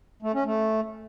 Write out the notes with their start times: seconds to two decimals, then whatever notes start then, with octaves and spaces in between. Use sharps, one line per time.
0.22 A3
0.34 C#4
0.45 A3